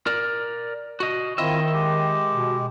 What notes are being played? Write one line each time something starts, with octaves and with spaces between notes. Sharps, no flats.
A#4 D5
F#4 D#5
D#3 C4 E4 F4 D#5 E5
G#3 G4
B2